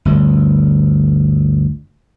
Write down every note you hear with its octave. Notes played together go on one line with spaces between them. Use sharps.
G1 D2